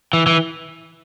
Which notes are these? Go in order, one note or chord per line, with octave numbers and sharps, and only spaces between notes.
E3
E3